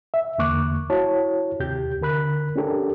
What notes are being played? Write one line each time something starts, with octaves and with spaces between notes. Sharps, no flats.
E5
E2 D3 A#3 C#6 D6 F#6
E4 F#4 C#5 A5
D#2 C3 G4 G6
D3 A#4 B5 F#6
C#4 D4 G4 A4 A#4